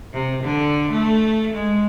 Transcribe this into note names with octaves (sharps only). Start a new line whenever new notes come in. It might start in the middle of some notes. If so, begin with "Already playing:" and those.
C3
D3
A3
G#3